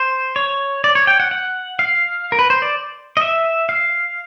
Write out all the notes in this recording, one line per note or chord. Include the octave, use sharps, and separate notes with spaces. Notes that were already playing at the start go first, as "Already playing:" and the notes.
Already playing: C5
C#5
D5
C#5
G5
F#5
F#5
F5
A#4
B4
C5
D5
D#5
E5
F5